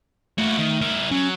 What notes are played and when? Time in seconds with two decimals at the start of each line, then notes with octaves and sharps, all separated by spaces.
0.38 A3 A#3 F#4
0.58 D#3
0.81 E4 A#4
1.11 F#3 C#4